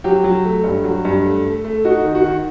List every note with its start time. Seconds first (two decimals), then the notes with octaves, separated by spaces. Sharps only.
0.04 F#3 G4
0.24 F#3
0.45 A3
0.64 G2
0.84 F#3
1.05 G2
1.24 A3
1.45 A3
1.64 A3
1.85 D#4 F#4
2.04 D#3
2.15 F#4
2.24 D#3